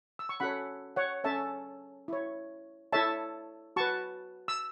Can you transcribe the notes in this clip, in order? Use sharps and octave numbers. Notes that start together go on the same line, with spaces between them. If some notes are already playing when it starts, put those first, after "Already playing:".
E6
C#6
C#4 F#4 A4 C#5 F#5 B5
C#5 F#5
C#4 A4 C#5 E5 A5
E4 C#5
E4 A4 C#5 E5 A5
F#4 B4 A5 C#6
E6